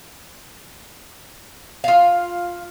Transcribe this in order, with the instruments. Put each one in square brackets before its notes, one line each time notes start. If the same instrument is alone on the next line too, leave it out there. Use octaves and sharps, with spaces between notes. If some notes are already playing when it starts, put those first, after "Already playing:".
[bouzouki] F4 F5